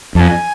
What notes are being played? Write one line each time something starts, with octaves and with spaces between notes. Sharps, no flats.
F2 A5
G#5